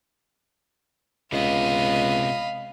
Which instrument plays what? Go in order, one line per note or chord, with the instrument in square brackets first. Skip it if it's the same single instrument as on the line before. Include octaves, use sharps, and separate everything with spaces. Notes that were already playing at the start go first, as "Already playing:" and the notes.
[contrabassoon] C#2 [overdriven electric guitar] C3 B3 [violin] D#5 [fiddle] F5 B5